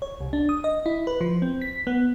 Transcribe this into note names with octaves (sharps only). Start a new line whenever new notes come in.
C#5
C2
D4
D#6
D#5
E4
B4
F3
C4
B6
B3